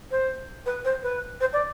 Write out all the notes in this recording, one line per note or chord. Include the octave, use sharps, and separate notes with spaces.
C5
B4
C5
B4
C5
D5